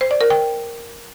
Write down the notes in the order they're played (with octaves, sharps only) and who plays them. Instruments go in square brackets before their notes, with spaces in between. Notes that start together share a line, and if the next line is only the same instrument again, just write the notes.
[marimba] C5
D5
A#4
G5